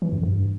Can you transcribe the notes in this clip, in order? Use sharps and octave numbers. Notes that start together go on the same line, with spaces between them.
E3
F#2
G2